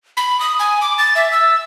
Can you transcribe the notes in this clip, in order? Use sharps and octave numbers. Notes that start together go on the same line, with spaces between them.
B5
D#6
G#5
D6
A6
E5
E6